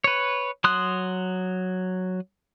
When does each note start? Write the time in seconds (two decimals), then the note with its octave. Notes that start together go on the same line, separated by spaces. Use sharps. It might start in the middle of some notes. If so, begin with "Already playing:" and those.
0.04 B4 C#5
0.64 F#3 C6 D#6 F#6